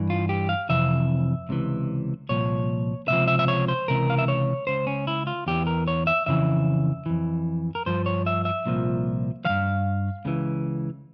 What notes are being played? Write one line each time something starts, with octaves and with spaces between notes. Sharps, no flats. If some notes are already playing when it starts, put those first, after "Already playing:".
Already playing: G2 E3
F4
G4
F5
F2 C3 E3 E5
C#2 C3 E3
C2 A#2 F3 C#5
C#2 C3 F3 E5
E5
E5
C#5
C5
C#2 C3 E3 A#4
F5
E5
C#5
C#2 C#3 C5
C#4
E4
F4
E2 E3 G4
A#4
C#5
E5
F2 C#3 E3 E5
F2 E3
A#4
G2 F3 C5
C#5
E5
E5
C2 A#2 F3
G2 E3 F5
C#2 C#3 E3